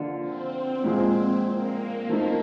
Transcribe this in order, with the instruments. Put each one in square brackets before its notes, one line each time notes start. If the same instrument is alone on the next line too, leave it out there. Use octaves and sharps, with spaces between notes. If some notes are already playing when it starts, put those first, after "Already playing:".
Already playing: [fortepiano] D3 F3 A#3 D4 F4
[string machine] C4
[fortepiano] A#2 F3 G#3
[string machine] A#3
[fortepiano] F3 A3 C4 D#4